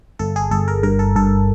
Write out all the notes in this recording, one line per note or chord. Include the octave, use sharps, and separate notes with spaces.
G1 A4
G#4
G1 A4
A#4
G2 A#4
A4
G2 A4